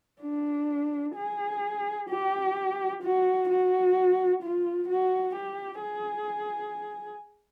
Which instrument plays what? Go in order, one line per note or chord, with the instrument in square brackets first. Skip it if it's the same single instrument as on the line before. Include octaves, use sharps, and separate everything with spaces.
[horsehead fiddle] D4
G#4
G4
F#4
F#4
F4
F#4
G4
G#4